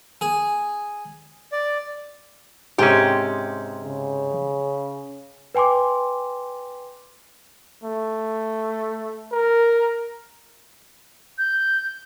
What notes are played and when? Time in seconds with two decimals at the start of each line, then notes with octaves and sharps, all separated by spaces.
0.21 G#4
1.52 D5
2.78 G#2 C3 C#4 G4 G#4
3.83 C#3
5.55 B4 G5 G#5 C6 D6
7.83 A3
9.32 A#4
11.38 G6